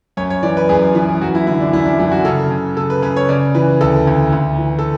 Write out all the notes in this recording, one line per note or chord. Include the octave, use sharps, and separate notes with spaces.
F#2 C#5
C#5
E3 D5
B4
F#2 G#4
E3
F#2 F#4
E4
D3 E4
D4
F#2 E4
D4
F#2 E4
F#4
C#3 A4
C#3
C#3 A4
B4
C#3 B4
C#5
C#3 D5
E3 B4
D2 A4
D2
D2
E3
A4